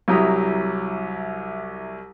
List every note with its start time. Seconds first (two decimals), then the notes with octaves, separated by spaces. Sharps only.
0.08 C2 F#3 E4 G4 A#5 D#6